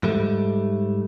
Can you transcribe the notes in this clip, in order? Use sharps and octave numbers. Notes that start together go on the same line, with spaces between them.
G#2 G3 A3